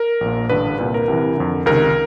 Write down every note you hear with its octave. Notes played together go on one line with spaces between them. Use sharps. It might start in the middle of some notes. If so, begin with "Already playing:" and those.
Already playing: A#4
A#1 A#2
A1 G2 D3 B4
C2 A#2 B4
A#4
C2 C3 E3
F2 D3
C#2 C3 D#3 A#4